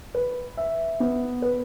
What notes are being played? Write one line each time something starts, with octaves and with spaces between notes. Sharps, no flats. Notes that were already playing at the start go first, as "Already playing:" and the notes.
B4
E5
B3
B4